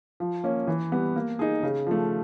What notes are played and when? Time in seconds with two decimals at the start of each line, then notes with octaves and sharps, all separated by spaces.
0.20 F3
0.44 A#3 C#4
0.67 E3
0.92 G3 B3
1.16 A#3
1.39 D#4 G#4
1.63 C#3
1.87 F3 A3